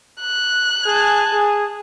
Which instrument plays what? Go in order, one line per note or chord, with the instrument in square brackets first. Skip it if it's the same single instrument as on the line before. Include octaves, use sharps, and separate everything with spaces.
[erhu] F#6
[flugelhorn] G#4 [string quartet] G#5 A5 G#6
[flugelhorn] G#4